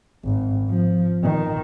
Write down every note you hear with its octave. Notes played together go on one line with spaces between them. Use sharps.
G#1
F3
D#3